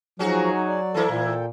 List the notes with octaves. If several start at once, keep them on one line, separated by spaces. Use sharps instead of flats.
F3 F#3 G#3 C#4 D#4 F#4 G#4
D5
E3 A#3 E4 A4
A#2
A4 G5